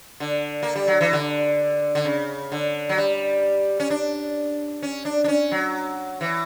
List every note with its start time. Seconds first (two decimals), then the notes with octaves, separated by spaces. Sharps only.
0.20 D3
0.63 A#3
0.76 G3
0.88 F#3
1.01 E3
1.13 D3
1.95 D3
2.05 C#3
2.52 D3
2.89 F#3
2.98 G3
3.80 C#4
3.90 D4
4.83 C#4
5.05 D4
5.24 D4
5.28 C#4
5.52 F#3
6.21 E3